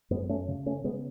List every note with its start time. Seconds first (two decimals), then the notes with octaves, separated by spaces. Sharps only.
0.11 F#2 G#3 B3
0.29 A3 C#4
0.48 C#3
0.66 A3 C#4
0.84 C#3 G#3 B3